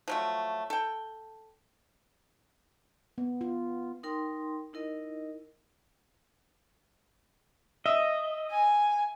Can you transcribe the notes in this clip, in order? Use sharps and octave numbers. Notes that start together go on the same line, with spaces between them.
F3 F#3 A3
A4 G5
B3
F4
D#4 A#4 G5 C6
D#4 E4 A#4 D#5
D#5 E5
G#5